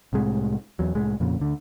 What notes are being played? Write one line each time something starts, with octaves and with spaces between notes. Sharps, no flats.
C2 A2 C3 G#3
E2 F#3
C2 A2 G#3
F2 A#2 C#3
D2 D3